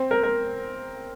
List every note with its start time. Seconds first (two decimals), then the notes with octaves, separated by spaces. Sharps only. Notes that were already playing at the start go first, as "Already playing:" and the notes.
Already playing: C4
0.11 A#4
0.23 A#4